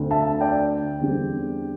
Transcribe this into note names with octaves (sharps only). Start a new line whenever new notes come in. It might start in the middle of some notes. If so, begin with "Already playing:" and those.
Already playing: D2 D3 A3 C4
E5 A5
D5 G5
E2 D3 G3 C4